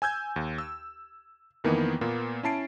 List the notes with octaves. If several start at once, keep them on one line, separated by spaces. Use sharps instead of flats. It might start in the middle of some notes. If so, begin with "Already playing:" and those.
G#5 E6 G6 G#6
D#2
E6
F2 D#3 E3 A#3 B3
A#2 A#3 B3
C#4 E4 A5 C7 D7